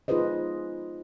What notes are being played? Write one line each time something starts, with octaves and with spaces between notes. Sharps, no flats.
D#4 F4 G#4 B4 C5 D#5